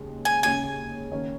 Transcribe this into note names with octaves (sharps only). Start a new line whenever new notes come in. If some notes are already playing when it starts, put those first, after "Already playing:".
Already playing: D#2 C#3 G#3 C#4
G#5
D#2 C#3 G#3 C#4 G#5
D#3 A#3 C#4